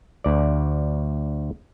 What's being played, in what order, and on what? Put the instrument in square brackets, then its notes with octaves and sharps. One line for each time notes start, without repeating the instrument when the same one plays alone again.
[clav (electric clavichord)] D2 D5